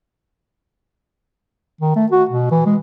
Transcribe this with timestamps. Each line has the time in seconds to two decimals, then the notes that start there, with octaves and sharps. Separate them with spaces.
1.81 D#3
1.96 A3
2.12 F#4
2.29 B2
2.51 E3
2.66 G#3